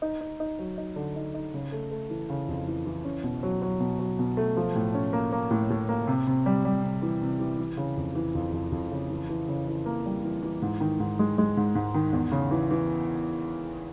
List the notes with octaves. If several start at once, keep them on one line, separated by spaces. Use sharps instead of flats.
D#4
D#4
D#4
F#3
D#4
D3
D#4
D#4
C#3
A3
A3
E3
C#3
F2
E3
E3
C#4
B2
F#3
F#3
B2
F#3
B2
A3
F3
A2
C#4
A#3
A#3
A2
A2
A#3
C3
C3
G3
G3
C3
E3
C3
E3
E3
C#3
F2
E3
F2
F2
F2
C#3
E3
E3
C#3
E3
A#3
G3
E3
E3
G#2
D#3
G#2
G#3
G#3
G#2
G#2
D#3
E2
C#3
E3
E3